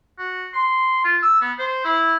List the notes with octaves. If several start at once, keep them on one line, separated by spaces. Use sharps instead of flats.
F#4
C6
F4
E6
B3
C5
E4